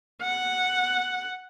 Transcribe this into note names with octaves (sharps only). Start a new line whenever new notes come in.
F#5